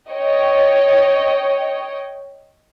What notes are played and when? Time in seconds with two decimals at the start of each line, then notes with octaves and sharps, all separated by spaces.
0.10 C#5 D#5 G5